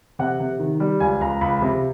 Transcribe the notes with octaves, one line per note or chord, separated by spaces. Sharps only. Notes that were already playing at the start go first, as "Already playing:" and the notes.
C3 F#5
C3
D#3
G3
C#2 G#5
C#2 A#5
C#2 B5
C3